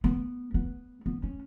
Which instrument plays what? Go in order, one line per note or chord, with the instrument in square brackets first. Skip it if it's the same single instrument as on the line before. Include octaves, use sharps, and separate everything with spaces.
[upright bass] B3
B3
B3
C#4